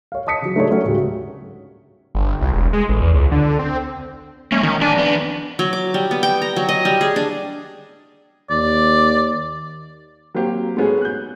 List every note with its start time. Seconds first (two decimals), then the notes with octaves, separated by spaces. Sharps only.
0.12 C#5 F5
0.27 D#5 A5 D#6 B6 C#7
0.42 C#3 F#3
0.56 A3 D4 D#4 G#4 A#4 C#5
0.71 F#3 A3 C#4 F#4
0.84 D1 C#3 G#3 G4
2.15 G1
2.41 C2
2.53 E1
2.73 G#3
2.89 A1
3.02 E2
3.14 C#2
3.31 D3
3.59 C4
4.52 G#3 A#3 C#4
4.63 D#3 C#4
4.81 A2 D4 G#5
4.95 F2 B3
5.59 F#3
5.73 D6
5.94 G3
6.11 B3
6.23 G5
6.42 A#5
6.56 F#3
6.69 D#5
6.85 G3
7.01 G#4
7.16 D4
8.50 D#2 D5
10.35 F#3 A#3 C4 G4
10.77 G#3 A3 B3 C#4 F#4 G#4
11.01 F#6 G6